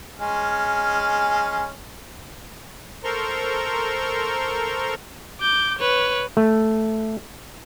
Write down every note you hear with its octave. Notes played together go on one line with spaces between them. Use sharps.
G#3 C#4 F6
A4 A#4 C5 A#5 C6 C#6
D6 G6
B4 C#5
A3